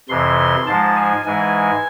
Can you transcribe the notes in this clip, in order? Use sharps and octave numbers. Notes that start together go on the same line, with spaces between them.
F2 C3 E3 C6
G#2 F3 G#3 A5
G#5
G#2 E3 G#3 G#5